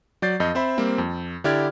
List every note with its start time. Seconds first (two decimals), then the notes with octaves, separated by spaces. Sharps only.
0.22 F#3 D5 G6 A6 C7
0.40 F2 D#5 G6
0.55 C4 C5 E5 B5
0.78 G3 A#3 C4
0.98 F2
1.44 D3 E4 G4 D5 F6 G#6